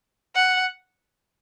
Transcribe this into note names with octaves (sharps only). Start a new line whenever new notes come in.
F#5